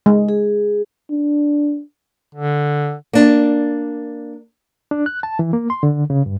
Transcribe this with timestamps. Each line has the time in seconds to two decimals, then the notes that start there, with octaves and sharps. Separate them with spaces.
0.06 G#3
0.29 G#4
1.10 D4
2.35 D3
3.13 A#3 D4
4.91 D4
5.06 F#6
5.23 A5
5.39 E3
5.53 A#3
5.70 C6
5.83 D3
6.10 C#3
6.26 G2